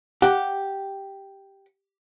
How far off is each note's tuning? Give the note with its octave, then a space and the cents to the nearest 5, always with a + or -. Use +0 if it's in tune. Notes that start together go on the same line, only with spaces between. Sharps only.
G4 +0 F#5 +0